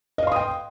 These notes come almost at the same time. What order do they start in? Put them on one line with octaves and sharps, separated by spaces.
D#5 F5 C6 D#6 G5